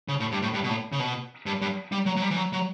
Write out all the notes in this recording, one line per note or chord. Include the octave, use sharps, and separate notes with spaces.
C#3
A2
G2
A2
G2
B2
A2
C#3
B2
G2
G2
G3
F#3
F#3
G3
E3
F#3
F#3